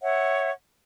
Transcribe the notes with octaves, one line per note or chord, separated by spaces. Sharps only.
C#5 E5 F#5